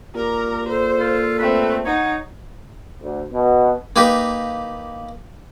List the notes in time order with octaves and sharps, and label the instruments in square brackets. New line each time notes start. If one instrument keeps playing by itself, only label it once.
[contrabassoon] A#2 [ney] G4 [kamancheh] A#4 A#5
[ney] A4 [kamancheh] C5
[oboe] F4
[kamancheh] A3 C4 [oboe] B4
[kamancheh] D#4 [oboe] C#5 [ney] F#5
[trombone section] D2
B2
[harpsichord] A#3 D#4 G4 B4